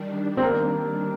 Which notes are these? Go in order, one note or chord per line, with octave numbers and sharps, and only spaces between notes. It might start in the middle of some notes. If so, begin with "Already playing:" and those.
Already playing: D#3 G3 D4
C4
A#3